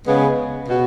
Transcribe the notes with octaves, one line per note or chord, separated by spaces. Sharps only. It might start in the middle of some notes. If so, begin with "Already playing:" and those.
C#3 G#3 B3
B2 B3 F#4